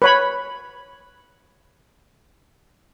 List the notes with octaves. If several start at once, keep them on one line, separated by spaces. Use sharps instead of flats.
B4 C#5 B5